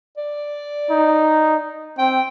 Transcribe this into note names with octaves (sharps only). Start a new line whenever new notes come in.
D5
D#4
C4 G5